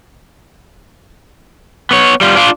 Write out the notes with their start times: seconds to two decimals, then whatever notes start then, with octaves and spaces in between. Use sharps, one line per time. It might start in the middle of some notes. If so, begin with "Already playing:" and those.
1.91 B3 C#5
2.21 G3 F4
2.35 D4 F4